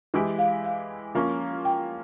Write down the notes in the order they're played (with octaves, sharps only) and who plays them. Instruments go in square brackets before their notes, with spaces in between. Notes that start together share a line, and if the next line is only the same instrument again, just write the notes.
[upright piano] E3 G#3 E4 G4
[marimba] F5
F5
[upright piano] F3 A#3 C#4
[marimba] G5